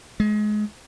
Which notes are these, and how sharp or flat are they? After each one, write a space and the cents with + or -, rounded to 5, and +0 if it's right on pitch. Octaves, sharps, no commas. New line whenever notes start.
G#3 +25